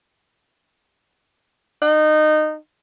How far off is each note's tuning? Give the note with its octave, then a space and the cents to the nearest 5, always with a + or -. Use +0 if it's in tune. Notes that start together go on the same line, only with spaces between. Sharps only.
D#4 -20